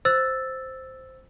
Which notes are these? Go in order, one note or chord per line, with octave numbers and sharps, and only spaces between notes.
C5 E6 A6